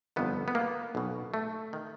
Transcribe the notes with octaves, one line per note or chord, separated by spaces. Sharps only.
G1 F2 C3 D#3 B3
B3
A#3
B1 B2
A3
D#3